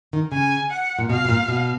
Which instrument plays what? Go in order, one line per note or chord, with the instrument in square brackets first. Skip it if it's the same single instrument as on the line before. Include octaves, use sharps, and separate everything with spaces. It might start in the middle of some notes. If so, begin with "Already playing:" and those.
[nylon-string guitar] D#3
[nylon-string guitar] C#3 [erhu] G#5
[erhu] F#5
[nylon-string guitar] A#2
[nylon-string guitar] B2 [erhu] F5
[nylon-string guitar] B2
A#2
B2